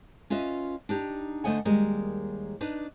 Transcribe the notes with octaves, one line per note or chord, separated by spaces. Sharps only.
C#4 F4 B4 D#5 E5
D4 D#4 G4
D3 A3 C5 D#5 F#5 G#5
D#2 G3 G#3 A#4 D#5
D4 D#4 B4